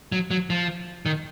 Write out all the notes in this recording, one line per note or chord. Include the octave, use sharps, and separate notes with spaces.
F#3
F#3
F3
D#3